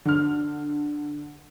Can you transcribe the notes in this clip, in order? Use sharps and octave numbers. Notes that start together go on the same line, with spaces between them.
D3 F6